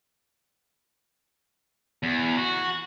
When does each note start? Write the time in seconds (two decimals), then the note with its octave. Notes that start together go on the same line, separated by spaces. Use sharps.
2.03 E2
2.37 F#4